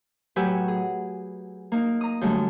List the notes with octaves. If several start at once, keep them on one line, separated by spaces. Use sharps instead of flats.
A2 F#3 G4 B4 G#5 E6
G#4
A#3 D#4
A#5 D#6
F#2 D3 G3 A3 C#4